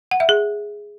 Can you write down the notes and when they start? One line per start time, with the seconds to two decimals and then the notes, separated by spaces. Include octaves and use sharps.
0.11 F#5
0.20 E5
0.29 G#4